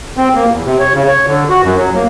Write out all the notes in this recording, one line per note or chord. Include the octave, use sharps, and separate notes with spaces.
C4
A#3
E2
C3
C#5
C#3
C#5
D3
F#4
F#2
F#3
A#3